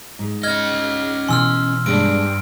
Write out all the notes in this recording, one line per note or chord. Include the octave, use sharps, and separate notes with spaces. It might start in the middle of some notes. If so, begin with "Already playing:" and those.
G#2
C#4 D#5 F6 G#6
B2 E3 G#5 C6 E6 F6
G2 G#3 B3 D4 D7